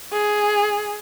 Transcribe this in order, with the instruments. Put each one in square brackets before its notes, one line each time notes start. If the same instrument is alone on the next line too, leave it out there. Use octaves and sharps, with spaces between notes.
[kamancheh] G#4